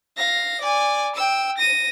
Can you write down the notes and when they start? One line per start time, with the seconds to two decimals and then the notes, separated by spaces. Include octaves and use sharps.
0.17 F5 A#6
0.61 D5 G#5
1.15 G5 E6
1.57 A#6 D#7